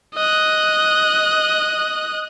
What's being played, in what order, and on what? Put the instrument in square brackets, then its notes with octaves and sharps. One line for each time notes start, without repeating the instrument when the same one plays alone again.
[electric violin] D#5 F#6